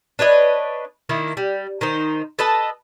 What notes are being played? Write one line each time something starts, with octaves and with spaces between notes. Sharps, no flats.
D4 B4 C#5 D#5
D#3 A#3 E4
G3
D#3 D#4 C5
A4 B4 D#5 A5